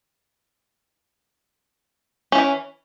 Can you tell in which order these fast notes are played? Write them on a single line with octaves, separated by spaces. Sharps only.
C#4 F3 E3